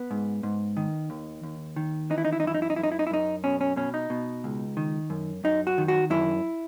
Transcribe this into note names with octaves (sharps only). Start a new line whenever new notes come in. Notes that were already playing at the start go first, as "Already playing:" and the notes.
Already playing: B3
G#2
G#2
D#3
D#2
D#2
D#3
E3 D#4
E4
D#4
E4
D#4
F#2 E4
D#4
E4
D#4
F#2 E4
D#4
E4
D#4
E4
F#2 D#4
B2 C#4
C#4
B2 C#4
D#4
B2
C#2
D#3
F#2
F#2 D#4
F#4
D#3
F#4
F#2 E4